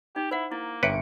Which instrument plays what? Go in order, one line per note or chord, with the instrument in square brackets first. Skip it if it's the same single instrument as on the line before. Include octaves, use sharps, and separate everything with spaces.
[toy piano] D#4 [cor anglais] G4
[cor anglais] E4 [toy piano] C5 F#5
[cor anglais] A#3 [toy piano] E4
[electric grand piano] G1 C#7 D7 [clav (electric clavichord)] B4 [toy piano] C#5 E5 G5